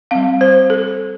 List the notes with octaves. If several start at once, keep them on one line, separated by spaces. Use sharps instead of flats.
G3 C4 F5
C5
A4